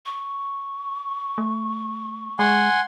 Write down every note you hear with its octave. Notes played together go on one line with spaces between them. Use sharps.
C#6
A3
G#3 F#5 G#5 C6